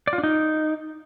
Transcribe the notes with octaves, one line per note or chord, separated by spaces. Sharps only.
D5
F4
D4
D#4